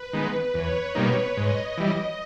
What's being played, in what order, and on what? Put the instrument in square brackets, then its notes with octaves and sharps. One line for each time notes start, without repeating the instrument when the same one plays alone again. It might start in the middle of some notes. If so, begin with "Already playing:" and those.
Already playing: [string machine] B4
[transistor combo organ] D#3 G#3 B3
[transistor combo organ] E2 [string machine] C#5
[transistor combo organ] B2 G3 A#3 D#4
[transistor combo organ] G#2 [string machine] D#5
[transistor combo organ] E3 G3